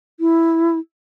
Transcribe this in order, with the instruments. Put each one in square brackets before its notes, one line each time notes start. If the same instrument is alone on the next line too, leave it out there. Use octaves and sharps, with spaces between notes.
[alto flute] E4